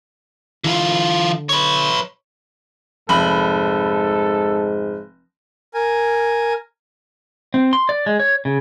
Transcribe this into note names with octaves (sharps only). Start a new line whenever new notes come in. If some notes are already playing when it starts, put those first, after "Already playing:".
D3 E3 F4
B4 C#5
F1 G#2 A4 B5 F#7
A#4 G#5
C4
C6
D5
G#3
C#5
C#3